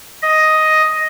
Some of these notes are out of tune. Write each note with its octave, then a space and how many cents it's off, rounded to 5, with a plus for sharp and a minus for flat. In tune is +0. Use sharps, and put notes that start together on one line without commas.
D#5 +5